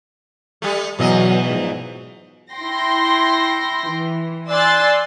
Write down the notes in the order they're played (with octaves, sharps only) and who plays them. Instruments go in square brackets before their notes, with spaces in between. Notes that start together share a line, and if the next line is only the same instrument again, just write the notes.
[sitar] G3 A3
[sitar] E2 E3 D#5 [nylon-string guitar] B2 [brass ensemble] F#3
[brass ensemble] G#2 F3
[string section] E4 G5 C6 A#6
E3
D5 G#5 C6 E6 F#6 A6